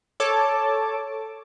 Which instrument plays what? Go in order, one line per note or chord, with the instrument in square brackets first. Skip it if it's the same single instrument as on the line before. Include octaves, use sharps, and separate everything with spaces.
[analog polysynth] A4 C#5 A5 D6